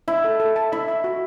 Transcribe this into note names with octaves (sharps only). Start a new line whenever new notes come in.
E4 E5
A4
A4
A5
E4 E5
E5
F#4